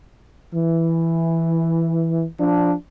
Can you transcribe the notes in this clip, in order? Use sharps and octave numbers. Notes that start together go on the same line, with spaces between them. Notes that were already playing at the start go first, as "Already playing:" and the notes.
E3
F3 D4